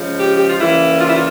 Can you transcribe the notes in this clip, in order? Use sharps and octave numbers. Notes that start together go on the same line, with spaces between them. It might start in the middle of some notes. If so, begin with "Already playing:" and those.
Already playing: C#3 F3 G#3
G4
G4
F4
C#3 E3 G3 A#3 E4
F4
E4
F4